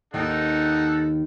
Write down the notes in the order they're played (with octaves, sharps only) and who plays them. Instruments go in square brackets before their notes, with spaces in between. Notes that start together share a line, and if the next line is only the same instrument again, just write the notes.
[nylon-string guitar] D#2 D#3 [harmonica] D#4 A4 F#5